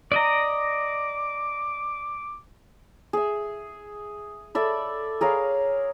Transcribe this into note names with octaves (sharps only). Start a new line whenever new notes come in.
D5 D#5 A#5 D6
G#4 E5
A4 D5 E5 B5
G#4 A#4 C#5 F5